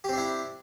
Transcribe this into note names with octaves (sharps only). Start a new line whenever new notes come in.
C4 D4 E4 G4